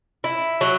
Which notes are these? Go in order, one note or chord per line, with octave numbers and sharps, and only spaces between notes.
E4
F#3